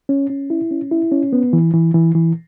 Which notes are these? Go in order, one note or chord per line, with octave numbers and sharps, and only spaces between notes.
C#4
C#4
E4
C#4
E4
C#4
B3
E3
E3
E3
E3